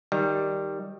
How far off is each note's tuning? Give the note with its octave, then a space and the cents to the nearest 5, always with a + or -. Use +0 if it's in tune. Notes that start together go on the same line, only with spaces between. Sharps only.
D#3 +0 G3 +0